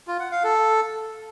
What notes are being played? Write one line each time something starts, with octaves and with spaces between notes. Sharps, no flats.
F4
F#5
F5
A4